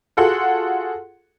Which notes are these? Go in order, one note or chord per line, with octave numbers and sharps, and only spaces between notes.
F4 F#4 G#4 A4 F#5 C6